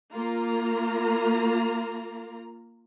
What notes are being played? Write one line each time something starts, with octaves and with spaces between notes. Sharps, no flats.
A#3 F4 A#5